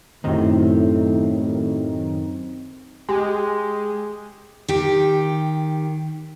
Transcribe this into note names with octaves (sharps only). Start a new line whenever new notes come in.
F#2 A2 D#3 C4 G4
G#3 G4
D#3 G4